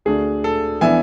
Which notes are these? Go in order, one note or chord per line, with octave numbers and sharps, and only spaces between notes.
D2 D3 A3 D4 G#4
A4
E3 B3 D4 E5 G#5